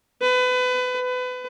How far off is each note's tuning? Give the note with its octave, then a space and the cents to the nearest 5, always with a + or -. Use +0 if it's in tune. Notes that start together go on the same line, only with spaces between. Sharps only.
B4 +30
B4 +30